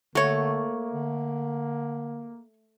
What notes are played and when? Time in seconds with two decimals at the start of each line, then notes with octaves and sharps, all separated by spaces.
0.15 D3 A3 A#3 F#4 C#5
0.93 D3